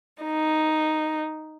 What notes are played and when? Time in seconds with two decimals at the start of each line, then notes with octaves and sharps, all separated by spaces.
0.23 D#4